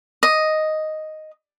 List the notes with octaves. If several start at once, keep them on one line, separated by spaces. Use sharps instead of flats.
D#5